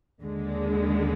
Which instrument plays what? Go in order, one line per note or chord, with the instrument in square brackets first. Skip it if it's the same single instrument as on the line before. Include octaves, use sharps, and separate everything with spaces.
[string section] D#2 D3 G#3